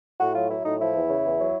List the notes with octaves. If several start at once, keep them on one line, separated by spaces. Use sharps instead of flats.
A2 F#4
F#3 F4
F#3 E4
A2 D#4
F3 E4
E2
C#3
E2
F#3